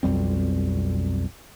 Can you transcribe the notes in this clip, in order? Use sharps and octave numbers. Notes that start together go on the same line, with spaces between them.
B1 F2 G3 C4